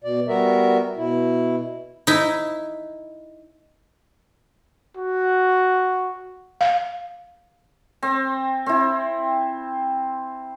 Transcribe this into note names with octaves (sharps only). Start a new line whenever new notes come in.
B2 D5
G3 B3 F#4 A#4 E5
B2 E4
D#4 E4
F#4
F5
C4
C4 E4